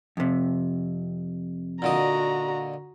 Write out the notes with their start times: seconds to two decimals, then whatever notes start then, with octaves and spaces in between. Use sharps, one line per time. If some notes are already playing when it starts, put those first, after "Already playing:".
0.17 F2 C3
1.82 A#2 D3 F#4 D#5 A#5